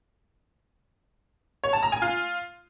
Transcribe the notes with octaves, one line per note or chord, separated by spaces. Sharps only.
C#5
A5
A#5
G#5
F4